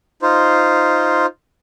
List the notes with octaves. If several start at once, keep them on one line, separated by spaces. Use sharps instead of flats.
D#4 F4 C5